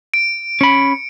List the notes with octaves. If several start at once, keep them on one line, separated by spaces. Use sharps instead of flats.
D7
C#4 B5 C#7